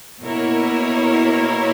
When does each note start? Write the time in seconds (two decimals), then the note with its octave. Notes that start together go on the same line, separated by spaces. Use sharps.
0.22 B2 A#3 E4 A#4 C#5